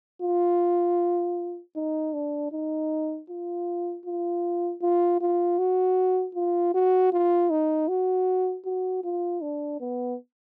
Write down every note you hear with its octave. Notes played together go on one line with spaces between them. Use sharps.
F4
D#4
D4
D#4
F4
F4
F4
F4
F#4
F4
F#4
F4
D#4
F#4
F#4
F4
D4
B3